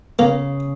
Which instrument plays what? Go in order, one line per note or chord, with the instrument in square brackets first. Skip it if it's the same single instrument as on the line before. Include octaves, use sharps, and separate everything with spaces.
[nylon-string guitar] C#3 [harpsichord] A#3